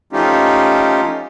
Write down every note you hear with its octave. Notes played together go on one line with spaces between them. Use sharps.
F3 A3 C#4 D#4 F4 G4